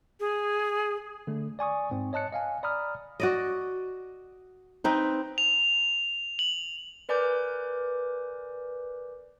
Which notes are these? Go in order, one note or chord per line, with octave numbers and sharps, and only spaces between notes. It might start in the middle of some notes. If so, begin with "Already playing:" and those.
G#4
D3 A3
D5 G#5 C#6 D#6
G#2 C4
C#5 D#5 A5 F#6 C#7
D#5 F5 G#5
D5 A#5 B5 D#6 F6
F#4 D5 D#5
C4 D#4 B4
F7
F#7
A#4 B4 D5 G#5 D6 G6